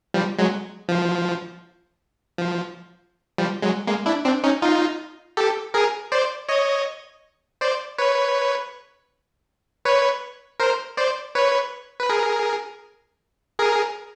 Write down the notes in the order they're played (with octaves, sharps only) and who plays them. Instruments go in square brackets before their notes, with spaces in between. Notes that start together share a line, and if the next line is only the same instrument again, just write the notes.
[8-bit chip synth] F3 G3
F#3 G#3
F3
F3
F3 G3
F#3 G#3
G#3 A#3
D4 E4
C4 D4
C#4 D#4
D#4 F4
G4 A4
G#4 A#4
C5 D5
C#5 D#5
C5 D5
B4 C#5
B4 C#5
A#4 C5
C5 D5
B4 C#5
B4
G#4 A#4
G#4 A#4